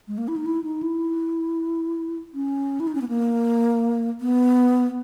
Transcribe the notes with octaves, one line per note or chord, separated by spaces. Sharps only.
G#3
A#3
E4
D#4
E4
D#4
E4
C#4
E4
D#4
C#4
B3
A#3
B3